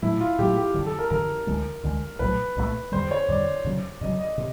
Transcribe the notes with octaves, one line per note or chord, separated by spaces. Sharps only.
A#2 F#3 A3 E4
F4
A#2 F#3 A3 G4
G4
F#2 D3 F3
A4
A#4
F#2 D3 F3 A#4
D2 D3 F3 G#3
D2 D3 F3 G#3
C2 A#2 F#3 A3 B4
C2 A#2 F#3 A3
F2 D3 G3 C5
C#5
F2 D3 G3 D5
F#2 C#3 F#3
F#2 C#3 F#3 D#5
D#5
C3